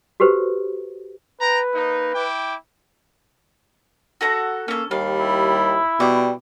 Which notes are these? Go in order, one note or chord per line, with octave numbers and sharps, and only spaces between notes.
F#4 G4 A4 B4 C5
B4 G5 A#5
A#3 D#4
E4 G5 D6
F#4 A4 A#5
A#3 C#4 A4
D#2 G3 F5
E4
B2 G3 D6